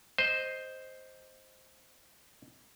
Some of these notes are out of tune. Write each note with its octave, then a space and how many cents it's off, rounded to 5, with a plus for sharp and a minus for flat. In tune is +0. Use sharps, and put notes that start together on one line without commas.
C5 +0 D#5 +0